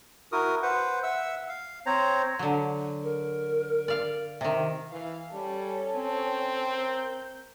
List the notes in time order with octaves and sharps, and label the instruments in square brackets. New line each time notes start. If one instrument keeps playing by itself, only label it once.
[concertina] E4 F#4 A#4 D#6
B4 C5 F#5
E5 F#5 E6
F5
C4 C5 C#5 A#5
[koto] D3 F#3
[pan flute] A#4
[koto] D5 F5
C3 D#3
[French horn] E3 [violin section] F5
[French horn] G3 [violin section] C#4 A4 C#5
[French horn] C4
[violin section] A#4 G6